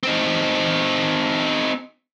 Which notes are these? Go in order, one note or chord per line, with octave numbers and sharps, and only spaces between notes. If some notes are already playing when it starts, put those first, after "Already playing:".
C4 D#4